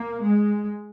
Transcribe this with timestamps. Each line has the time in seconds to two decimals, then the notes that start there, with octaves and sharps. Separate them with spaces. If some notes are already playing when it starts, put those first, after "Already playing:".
Already playing: A#3
0.25 G#3